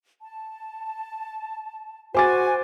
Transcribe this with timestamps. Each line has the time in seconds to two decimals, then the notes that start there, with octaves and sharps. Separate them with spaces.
0.21 A5
2.14 F#4 C5 G#5 D6 A6